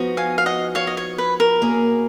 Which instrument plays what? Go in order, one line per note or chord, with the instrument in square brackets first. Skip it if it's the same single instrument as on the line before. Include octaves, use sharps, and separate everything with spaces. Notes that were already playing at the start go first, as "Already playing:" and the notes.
Already playing: [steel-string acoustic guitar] F3 B3 D#4 F#4
[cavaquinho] F5 G#5
F5
D#5 F#5
C#5 F5
D#5
C#5
B4
A#4
[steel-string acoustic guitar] B2 A#3 C#4 G#4